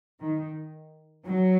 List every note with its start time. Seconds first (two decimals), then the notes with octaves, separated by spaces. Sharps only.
0.19 D#3
1.26 F#3